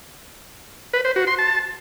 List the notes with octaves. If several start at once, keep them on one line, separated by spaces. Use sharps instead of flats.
B4
C5
F#4
C6
A5